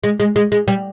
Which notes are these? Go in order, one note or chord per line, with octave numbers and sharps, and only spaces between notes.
G#3
G#3
G#3
G#3
G3